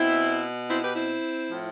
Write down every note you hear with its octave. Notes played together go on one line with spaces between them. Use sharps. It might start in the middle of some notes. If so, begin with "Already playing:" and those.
Already playing: B2 C4 E4
C4 E4
G4 B4
C4 E4
A2 F3